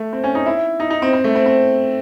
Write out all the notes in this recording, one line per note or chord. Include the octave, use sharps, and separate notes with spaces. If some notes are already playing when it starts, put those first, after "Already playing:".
Already playing: A3
C4
C#4
D#4
E4
D#4
D#4
C4
C4
A3
C4
C4